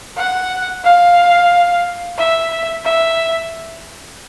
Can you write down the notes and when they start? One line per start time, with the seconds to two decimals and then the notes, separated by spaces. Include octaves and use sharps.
0.17 F#5
0.84 F5
2.18 E5
2.85 E5